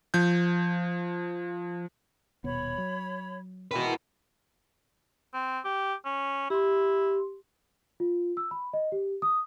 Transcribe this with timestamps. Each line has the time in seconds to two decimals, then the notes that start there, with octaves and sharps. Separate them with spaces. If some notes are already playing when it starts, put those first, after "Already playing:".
0.14 F3 G6
2.44 D#1 B2 B3 C#5 B5
2.78 F#3
3.71 D#3 E3 G#3 F#4 B4
5.34 C4
5.65 G4
6.05 C#4
6.50 E4 G4 C6
8.00 F4
8.37 E6
8.51 B5
8.73 D#5
8.92 G4
9.22 D#6